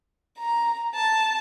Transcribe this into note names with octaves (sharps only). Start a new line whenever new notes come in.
A#5
A5